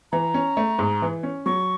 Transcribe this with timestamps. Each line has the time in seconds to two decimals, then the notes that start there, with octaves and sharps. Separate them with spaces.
0.12 E3 A#5
0.34 C#4
0.57 A3
0.79 G#2
1.02 E3
1.23 C#4
1.46 F#3 C#6